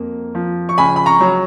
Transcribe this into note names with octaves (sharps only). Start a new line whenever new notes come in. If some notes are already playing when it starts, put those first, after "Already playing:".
Already playing: F2 A#3
F3
C#6
C#2 G#5 B5
B5
A#5 C#6
F#3